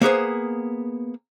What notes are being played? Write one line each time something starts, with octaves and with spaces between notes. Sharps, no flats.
A#3 B3 G#4 C5